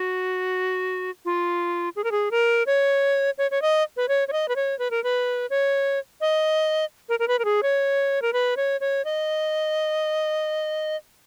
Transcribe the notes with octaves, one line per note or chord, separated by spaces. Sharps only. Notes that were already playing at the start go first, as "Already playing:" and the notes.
Already playing: F#4
F4
G#4
A#4
G#4
A#4
C#5
C#5
C#5
D#5
B4
C#5
C#5
D#5
B4
C#5
B4
A#4
B4
C#5
D#5
A#4
A#4
B4
A#4
G#4
C#5
A#4
B4
C#5
C#5
D#5